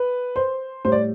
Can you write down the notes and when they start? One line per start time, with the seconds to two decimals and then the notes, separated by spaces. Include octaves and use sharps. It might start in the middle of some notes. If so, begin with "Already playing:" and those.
Already playing: B4
0.36 C5
0.85 A2 G3 C5
0.92 D5